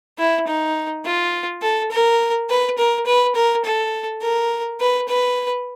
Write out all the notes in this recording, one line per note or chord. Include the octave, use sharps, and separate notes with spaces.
E4
D#4
F4
A4
A#4
B4
A#4
B4
A#4
A4
A#4
B4
B4